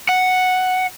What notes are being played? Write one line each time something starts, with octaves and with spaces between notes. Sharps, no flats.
F#5